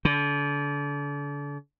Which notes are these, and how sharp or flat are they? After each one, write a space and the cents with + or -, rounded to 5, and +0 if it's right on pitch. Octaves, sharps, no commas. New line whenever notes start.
D3 -35